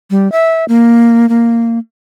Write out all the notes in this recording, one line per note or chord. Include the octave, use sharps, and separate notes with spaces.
G3
E5
A#3
A#3